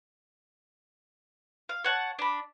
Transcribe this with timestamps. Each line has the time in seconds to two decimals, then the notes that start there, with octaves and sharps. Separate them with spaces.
1.69 F5
1.84 C#5 F#5 A5
2.19 D4 B5